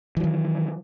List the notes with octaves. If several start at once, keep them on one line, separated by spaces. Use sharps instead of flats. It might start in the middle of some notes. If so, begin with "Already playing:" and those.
D#3 E3 F#3